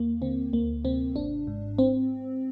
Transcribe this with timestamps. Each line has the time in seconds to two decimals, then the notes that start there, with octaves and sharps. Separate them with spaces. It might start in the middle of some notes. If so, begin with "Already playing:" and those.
Already playing: D#2 A#3
0.22 D3 C4
0.53 D2 A#3
0.85 C3 C4
1.16 G#1 D4
1.47 G#2
1.78 C4